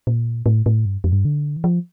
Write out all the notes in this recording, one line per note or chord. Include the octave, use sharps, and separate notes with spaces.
A#2
A2
A2
G2
F2
G2
D3
E3
F3